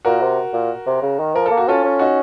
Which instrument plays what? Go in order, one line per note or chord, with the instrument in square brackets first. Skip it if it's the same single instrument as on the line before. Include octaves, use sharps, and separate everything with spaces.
[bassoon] A#2 [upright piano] F#4 A#4
[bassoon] C3
A#2
C3
C#3
D#3
[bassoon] F3 [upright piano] A#4
[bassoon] A#3 [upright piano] A4
[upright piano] F#4
[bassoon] C#4 [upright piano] F4 A4
[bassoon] C#4
[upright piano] D#4 F#4